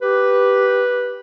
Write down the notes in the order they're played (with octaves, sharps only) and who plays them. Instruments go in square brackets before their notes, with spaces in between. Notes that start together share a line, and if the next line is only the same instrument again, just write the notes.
[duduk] G4 [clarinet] B4